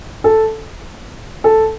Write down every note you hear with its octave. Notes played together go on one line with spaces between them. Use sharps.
A4
A4